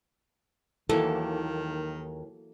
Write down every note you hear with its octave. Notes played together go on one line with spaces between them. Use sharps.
D#2 D#3 E3 F#3 A#3 A4